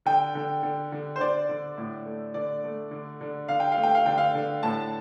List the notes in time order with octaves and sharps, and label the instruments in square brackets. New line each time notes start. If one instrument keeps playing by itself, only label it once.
[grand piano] D3 G5
D3
D3
D3
C5
D3 D5
D3
A2
A3
D3 D5
A3
D3
D3
D3 F5
G5
F5
A3
G5
F5
D3 G5
F5
D3
A2 A5